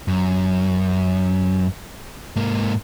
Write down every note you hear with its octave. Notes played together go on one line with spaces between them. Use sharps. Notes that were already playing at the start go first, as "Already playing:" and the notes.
F#2
G#2 A#3